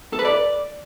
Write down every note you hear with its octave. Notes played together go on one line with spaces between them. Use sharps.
A4
B4
D5